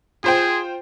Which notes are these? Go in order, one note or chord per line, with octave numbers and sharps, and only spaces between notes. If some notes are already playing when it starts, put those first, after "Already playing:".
F4 G#4 C5 G5